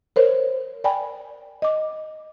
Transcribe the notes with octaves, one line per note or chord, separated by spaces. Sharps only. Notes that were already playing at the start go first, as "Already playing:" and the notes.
A#4 C5 C#5
D5 G5 G#5 B5
D#5 D6